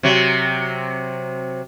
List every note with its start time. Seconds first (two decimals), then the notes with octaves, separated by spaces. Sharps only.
0.03 C3 F#3